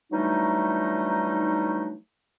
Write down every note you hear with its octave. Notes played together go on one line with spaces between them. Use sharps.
E3 F#3 G3 A3 D4 D#4